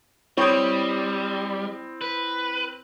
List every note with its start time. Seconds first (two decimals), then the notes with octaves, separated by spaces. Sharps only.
0.38 G3 C4 E4 C#5 G5 D#6
2.01 B4